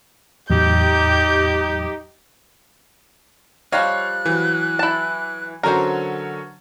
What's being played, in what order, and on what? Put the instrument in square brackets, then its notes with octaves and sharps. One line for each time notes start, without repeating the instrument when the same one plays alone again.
[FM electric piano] E2 A2 F#3 [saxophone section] D#4 G4 [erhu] G6
[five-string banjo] F3 G3 D#5 [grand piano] C#5 F5 F6 [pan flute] F#6
[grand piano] E3 F#3
[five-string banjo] E4 A5
[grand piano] D3 F#3 C#4 [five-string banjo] A#4 C5